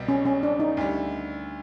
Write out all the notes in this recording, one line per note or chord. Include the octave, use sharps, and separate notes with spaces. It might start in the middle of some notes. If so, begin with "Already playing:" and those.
Already playing: C2 B2 G3
C#4
C#4
D4
D#4
D2 D3 G3